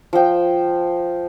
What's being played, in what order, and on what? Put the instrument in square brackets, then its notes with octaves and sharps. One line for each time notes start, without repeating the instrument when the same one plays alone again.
[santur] F3 G5